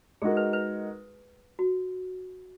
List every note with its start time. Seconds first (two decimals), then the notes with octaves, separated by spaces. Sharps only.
0.22 G#3 D#4 F#4 G#4 A#4
0.37 B4
0.53 B4
1.59 F#4